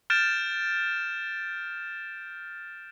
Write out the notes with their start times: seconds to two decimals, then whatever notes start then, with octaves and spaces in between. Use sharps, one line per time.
0.10 F6 G6 A6 D7 E7